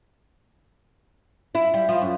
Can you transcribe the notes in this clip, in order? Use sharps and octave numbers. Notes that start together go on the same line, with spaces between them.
E4
G3
F3
F#2